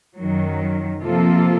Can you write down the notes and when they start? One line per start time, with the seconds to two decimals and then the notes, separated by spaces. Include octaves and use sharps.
0.17 F#2 D#3 F#3
1.01 C3 F3 A#3 F4 A4